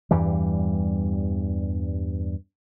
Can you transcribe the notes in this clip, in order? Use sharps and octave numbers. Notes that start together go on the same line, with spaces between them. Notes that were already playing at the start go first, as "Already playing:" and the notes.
E2 G2 E3 G3